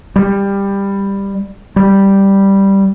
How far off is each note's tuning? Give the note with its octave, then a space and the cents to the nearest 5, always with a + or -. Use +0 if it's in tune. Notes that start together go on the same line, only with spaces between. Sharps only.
G3 +15
G3 +0